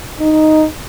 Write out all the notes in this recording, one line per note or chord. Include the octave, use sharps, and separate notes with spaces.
D#4